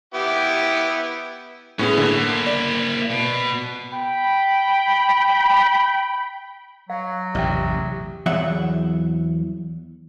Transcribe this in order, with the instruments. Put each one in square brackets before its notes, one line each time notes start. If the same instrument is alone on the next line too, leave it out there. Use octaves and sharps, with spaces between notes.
[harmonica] B3 E4 G4
[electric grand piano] A2 B3 G#4 [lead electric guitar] C#4
[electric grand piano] D3 [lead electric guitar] A#3 E4
[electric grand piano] D5
[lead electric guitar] B2
[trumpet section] G5 B5
[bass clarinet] F#3 [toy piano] F5
[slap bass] A1 E2 [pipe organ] C3 G4 [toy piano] D5 E5 G5
[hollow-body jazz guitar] E2 F#3 E5 F#5